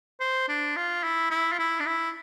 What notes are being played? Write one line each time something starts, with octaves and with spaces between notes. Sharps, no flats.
C5
D4
F4
E4
E4
F4
E4
D4
E4